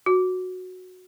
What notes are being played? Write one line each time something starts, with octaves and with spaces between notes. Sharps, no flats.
F#4